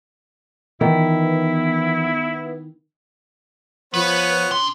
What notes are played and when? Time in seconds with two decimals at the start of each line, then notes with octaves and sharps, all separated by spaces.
0.81 D#3 E3 B3 E4 F4
3.94 F3 B3 B4 C#5
4.52 D4 C6